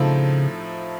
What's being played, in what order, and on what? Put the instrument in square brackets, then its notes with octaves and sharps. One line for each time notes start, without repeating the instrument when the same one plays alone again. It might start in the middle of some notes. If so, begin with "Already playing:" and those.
Already playing: [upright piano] A2 F3 C4 D#4 A4 [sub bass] C#3